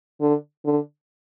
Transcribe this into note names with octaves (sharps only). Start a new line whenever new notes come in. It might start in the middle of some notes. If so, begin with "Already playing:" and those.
D3
D3